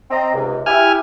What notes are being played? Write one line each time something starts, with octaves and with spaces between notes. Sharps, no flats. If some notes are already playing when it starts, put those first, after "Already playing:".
C4 D#5 A#5
C#2 G#2 C3
E4 G4 G#5 F6